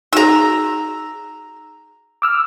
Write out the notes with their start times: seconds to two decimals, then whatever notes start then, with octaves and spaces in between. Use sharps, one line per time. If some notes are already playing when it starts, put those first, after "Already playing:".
0.13 D#4 F#4 G#4 A#5 E6
2.22 D6 E6 F6